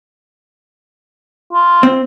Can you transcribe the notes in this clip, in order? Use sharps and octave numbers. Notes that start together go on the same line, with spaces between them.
F4
C4